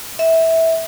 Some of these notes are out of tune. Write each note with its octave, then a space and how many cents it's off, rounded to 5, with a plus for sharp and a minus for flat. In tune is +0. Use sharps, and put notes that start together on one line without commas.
E5 -15